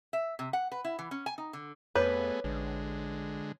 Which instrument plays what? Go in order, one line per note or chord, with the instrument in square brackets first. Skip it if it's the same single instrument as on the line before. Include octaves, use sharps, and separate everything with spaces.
[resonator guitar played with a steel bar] E5
C3
F#5
B4
E4
E3
C#4
G#5
D#4
D3
[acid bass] F2 [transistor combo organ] A3 B3 G#4 [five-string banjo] B4 [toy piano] C#5 D6
[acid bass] A1 [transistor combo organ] D3 G#3